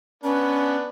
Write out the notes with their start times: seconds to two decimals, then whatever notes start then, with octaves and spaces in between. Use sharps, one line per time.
0.24 B3 C#4 D4 B4